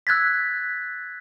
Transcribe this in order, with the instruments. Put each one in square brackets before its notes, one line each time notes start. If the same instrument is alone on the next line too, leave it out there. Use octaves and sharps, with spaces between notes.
[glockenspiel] E6 F#6 G#6 A6 B6